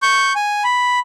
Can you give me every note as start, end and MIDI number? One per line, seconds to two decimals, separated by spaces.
0.02 0.33 85
0.02 0.33 91
0.35 0.63 80
0.64 0.99 83